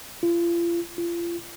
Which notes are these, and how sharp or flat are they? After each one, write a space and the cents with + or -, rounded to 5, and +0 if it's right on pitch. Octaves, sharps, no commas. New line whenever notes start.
F4 -40
F4 -35